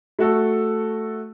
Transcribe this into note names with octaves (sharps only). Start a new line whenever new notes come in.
A3 F#4 A4